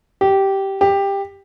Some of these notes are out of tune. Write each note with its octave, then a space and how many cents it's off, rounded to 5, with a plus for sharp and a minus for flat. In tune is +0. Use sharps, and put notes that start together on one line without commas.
G4 -10
G4 +15